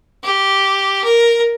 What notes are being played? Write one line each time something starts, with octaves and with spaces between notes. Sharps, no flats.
G4
A#4